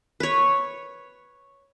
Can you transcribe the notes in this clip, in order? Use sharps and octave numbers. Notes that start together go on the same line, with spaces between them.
B4 C#5